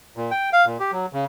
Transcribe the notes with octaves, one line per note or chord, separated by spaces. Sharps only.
A#2
G5
F5
A#2
G4
F#3
C#3